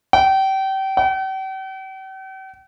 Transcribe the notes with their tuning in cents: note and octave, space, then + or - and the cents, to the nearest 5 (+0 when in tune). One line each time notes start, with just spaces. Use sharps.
G5 -30
G5 -45